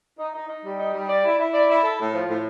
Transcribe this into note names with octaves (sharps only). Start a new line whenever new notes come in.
D#4
D#4
D#4
G3
D#4
G3
D5
E4
E4
D5
E4
A4
A2
F3
A2